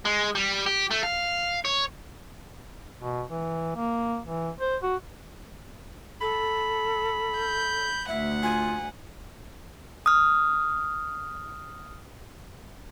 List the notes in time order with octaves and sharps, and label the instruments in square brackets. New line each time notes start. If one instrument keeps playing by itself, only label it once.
[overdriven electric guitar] G#3
G3
G4
A3
F5
C#5
[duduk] B2
E3
A#3
E3
C5
F#4
[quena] A4 [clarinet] B5
[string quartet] G6
[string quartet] D2 F#5 [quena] E5
[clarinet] F4 [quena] G#5
[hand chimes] D#6 F6